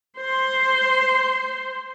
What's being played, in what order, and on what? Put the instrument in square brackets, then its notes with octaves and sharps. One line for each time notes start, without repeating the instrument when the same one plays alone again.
[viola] C5 C6